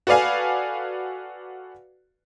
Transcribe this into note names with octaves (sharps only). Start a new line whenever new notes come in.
F#4 A4 B4 D5 F5 G#5